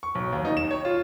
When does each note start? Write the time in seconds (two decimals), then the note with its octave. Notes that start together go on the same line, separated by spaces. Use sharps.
0.03 C#6
0.15 B1
0.32 D#2
0.45 D#4
0.57 E7
0.71 C#5
0.85 F4